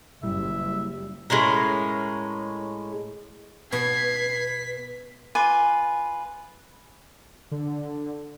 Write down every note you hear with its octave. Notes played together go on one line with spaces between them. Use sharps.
F#1 A#2 G3 E4 E5
A2 G#3 C#4 A#4
B2 B4 F#5 G#6 B6 C7
F4 B4 G#5 D6
D3